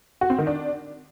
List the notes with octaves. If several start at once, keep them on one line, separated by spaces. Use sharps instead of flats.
F#4
C4
D#3
D4